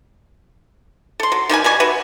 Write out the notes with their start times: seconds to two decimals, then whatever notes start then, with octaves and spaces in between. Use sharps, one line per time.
1.20 A4 C6
1.32 F#3
1.49 D#3 G3 B3 G#5
1.64 B2 G3 G#5 C#6
1.80 F#4 B4 E5